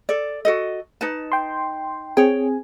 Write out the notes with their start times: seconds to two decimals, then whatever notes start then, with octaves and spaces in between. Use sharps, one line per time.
0.09 A4 D5
0.45 F#4 A4 D#5
1.01 D#4 B4 A5
1.32 G5 C6
2.17 C4 G#4 C#5 G5 G#5